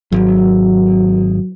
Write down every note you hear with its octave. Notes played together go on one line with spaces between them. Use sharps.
G#1 F#3